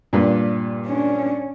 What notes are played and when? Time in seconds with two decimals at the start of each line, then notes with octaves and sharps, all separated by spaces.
0.13 G2 A#2
0.86 C#4 D4